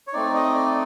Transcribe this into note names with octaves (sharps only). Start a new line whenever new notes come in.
C#5
A3 C4 D#4 D5
D#5
D5